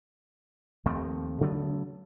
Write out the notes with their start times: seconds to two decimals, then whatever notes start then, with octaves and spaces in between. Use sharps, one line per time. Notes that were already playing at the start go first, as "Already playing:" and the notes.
0.86 D#2 F3 A3 C4
1.41 C#3 F#3 A3 B3